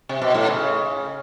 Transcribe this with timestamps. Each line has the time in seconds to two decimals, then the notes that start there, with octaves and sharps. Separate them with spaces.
0.09 C3
0.21 B2
0.34 A2
0.46 C#3